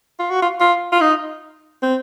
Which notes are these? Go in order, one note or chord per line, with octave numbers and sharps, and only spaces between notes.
F4
F#4
F4
F4
F4
D#4
C4